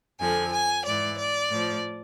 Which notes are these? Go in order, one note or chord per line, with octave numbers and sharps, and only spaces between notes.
F2 D3 F3 G#5
G#5
G#2 E3 D5
D5
A2 F3